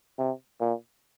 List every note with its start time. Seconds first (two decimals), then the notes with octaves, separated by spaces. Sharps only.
0.18 C3
0.61 A#2